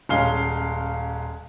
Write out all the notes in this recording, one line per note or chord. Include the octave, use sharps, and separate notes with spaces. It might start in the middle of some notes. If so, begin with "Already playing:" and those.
D#1 G#3 C#4 F5 G7